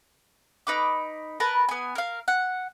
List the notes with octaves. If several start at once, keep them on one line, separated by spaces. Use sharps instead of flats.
D#4 B4 D6
A#4 B4 A5
B3 G#5
A#4 F5
F#5